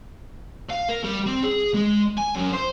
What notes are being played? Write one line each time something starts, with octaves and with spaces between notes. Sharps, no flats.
F5
A#4
G3
C4
G#4
G#3
G#5
F#2
C5